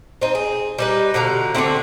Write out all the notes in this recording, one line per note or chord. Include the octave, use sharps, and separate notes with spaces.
C4 D#4
G#4
G3 D#4 B4
B2 D3 F3 A#5
D3 A3 C4 E4